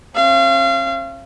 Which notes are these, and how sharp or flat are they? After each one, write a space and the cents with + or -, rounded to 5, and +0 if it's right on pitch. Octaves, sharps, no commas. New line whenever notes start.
C#4 -45 F5 -35